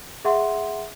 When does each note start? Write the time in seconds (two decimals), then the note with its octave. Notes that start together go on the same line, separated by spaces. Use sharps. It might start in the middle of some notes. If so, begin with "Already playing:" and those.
0.25 G#4 E5 F#5 C6